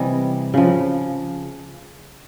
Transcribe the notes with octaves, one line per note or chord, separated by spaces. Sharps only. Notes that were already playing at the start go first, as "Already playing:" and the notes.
Already playing: C3 E3 G3 D#5
C#3 F3